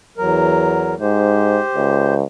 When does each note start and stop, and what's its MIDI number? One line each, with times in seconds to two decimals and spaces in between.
0.18 0.94 40
0.18 0.94 54
0.18 0.94 70
1.00 1.60 44
1.00 2.14 67
1.00 2.14 72
1.75 2.23 37